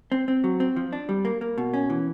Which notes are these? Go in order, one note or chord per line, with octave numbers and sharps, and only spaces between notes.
C4
C4
F#3
C4
F3
D4
G3
A#3
A#3
B2
C#4
E3